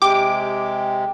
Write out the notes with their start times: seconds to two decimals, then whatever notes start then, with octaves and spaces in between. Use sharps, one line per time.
0.02 C3 G#3 G4 D6